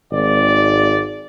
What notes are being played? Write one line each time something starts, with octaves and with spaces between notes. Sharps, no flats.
G#1 D5